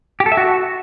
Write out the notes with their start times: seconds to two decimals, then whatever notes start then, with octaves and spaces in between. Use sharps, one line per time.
0.20 G4
0.26 A4
0.32 E5
0.37 F#4